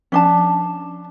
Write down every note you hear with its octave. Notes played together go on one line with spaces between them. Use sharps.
F3 C#4 D4 A5